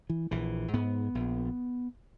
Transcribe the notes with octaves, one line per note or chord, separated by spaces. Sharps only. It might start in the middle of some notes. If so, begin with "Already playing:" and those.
E3
A#1 E3
G#2 B3
A#1